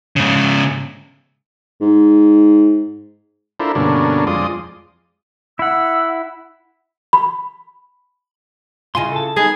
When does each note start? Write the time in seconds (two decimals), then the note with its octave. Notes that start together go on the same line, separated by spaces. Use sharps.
0.16 G#2 C#3
1.81 G#2
3.60 D4 E4 F4 A4 A#4 C5
3.75 G2 B2 D3 A#3 C#4 D4
4.27 F2 G#3 F4 D5 C6 D#6
5.59 E4 F#5 E6
7.13 B5
8.95 C#3 E4 F4 D#5 G#5 C6
9.12 A4 A5
9.37 B3 D#4 G#4